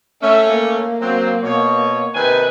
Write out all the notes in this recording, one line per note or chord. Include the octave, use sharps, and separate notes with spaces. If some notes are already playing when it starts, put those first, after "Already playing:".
A3 C#4 E5
A#3
F#3 C4
B2 C#5
C3 D#3 B4 G#5